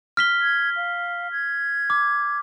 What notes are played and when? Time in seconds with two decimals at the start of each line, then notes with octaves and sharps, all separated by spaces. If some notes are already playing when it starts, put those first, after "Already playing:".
0.17 F6 B6 G7
0.42 G#6
0.76 F5
1.32 G#6
1.90 D6